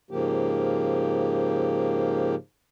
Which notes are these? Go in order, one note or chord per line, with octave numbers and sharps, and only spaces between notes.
G#2 C#3 F3 A#3 G4